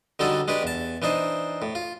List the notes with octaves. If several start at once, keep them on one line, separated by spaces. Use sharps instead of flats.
D3 F#3 G3 C#4 D#4 A4
G#3 D4 G4 B4
E2 A5
E3 D4 D#4 C5
A2
F4